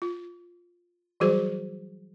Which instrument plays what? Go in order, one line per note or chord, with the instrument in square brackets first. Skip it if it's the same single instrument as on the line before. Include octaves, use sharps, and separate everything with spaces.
[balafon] F4
E3 F#3 G3 F#4 G#4 C5